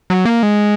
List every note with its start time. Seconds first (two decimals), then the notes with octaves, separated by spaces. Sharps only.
0.10 F#3
0.25 A#3
0.43 G#3